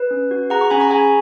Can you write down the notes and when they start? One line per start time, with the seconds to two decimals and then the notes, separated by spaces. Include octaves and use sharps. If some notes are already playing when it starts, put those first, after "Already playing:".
Already playing: B4
0.11 C#4
0.31 F#4
0.50 G#4 F#5 A#5
0.61 A#5 C#6
0.70 C#4 G#5 B5
0.80 A#5 C#6
0.90 G#4 G#5 B5